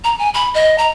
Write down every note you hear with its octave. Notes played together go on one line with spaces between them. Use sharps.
A#5
G#5
B5
D#5
A#5